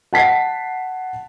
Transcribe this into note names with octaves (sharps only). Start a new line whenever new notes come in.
F#5 A5 B6 C7